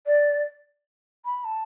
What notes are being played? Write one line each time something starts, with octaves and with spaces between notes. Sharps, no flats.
D5
B5
A5